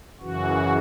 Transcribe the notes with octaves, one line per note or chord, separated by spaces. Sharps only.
F#2 C#3 E3 F#4